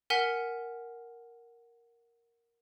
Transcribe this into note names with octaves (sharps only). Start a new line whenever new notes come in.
A#4 F#5 G#5 F6 B6